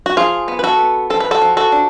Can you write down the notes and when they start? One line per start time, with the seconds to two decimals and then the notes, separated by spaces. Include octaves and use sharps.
0.06 F#4
0.17 F3 F4 G#4
0.48 B3
0.59 B4
0.64 F#4 A4
0.79 B3
1.10 F3 A4
1.20 B4
1.31 F#4 A4
1.42 F3
1.57 F#4 A4
1.72 D4